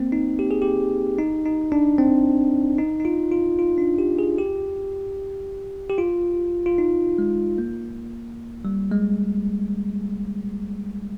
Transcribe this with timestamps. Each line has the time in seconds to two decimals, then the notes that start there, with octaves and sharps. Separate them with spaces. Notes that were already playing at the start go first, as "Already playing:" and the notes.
Already playing: A#3 C4
0.12 D#4
0.39 G4
0.51 G#4
0.62 G4
1.18 D#4
1.45 D#4
1.72 D4
1.98 C4
2.78 D#4
3.00 D#4
3.05 F4
3.31 F4
3.59 F4
3.78 D4
3.99 G4
4.19 G#4
4.38 G4
5.90 G4
5.98 F4
6.66 F4
6.78 D#4
7.18 G#3
7.58 A#3
8.65 G3
8.92 G#3